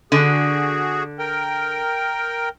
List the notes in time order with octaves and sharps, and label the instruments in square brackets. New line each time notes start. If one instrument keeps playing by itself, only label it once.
[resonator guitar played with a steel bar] D3 [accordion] F#4 G#4
[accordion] A#4 G5